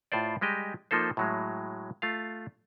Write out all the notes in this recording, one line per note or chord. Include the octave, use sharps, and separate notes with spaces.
A2 F4 C5 D5
G3 G#3 G4 D#5
F3 A#3 D#4 A4 C5
A2 F#3 G#3
A3 F4 F5